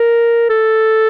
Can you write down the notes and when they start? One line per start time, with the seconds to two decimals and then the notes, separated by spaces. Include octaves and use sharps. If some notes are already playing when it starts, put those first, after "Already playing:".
Already playing: A#4
0.49 A4